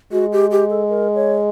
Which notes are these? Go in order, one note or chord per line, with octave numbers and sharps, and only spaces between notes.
G#3 F#4
G4
G4
A4
A#4
C#5